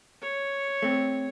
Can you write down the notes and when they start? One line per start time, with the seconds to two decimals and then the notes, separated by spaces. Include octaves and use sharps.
0.22 C#5
0.82 A3 C4